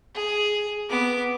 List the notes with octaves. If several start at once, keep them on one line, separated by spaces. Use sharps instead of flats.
G#4
B3 D6